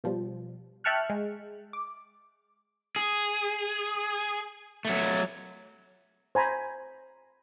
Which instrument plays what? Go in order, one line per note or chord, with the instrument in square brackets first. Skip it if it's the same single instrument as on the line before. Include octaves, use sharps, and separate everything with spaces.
[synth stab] B2 F3 G3
E5 G5 A5 C#6 F6 F#6
G#3
D6
[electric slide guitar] G#4
F#3 A3
[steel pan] C5 G#5 A#5 B5